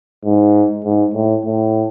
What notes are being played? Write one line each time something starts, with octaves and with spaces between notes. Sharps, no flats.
G#2
G#2
A2
A2